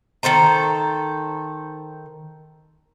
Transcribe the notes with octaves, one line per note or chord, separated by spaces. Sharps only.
D#3 A4 C5 A#5